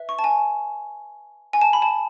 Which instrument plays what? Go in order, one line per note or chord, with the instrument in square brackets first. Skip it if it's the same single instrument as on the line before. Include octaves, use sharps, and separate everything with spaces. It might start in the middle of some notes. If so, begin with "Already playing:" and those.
Already playing: [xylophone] B4 E5
C#6
A5
G#5
G#5
A5
B5
A5